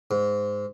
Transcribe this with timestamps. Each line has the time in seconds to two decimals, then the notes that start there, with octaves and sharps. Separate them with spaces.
0.11 G#2